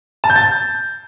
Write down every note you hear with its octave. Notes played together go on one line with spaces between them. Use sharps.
A5
G6
A6